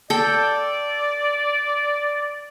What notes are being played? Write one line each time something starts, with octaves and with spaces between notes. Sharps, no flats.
A4 D5 G5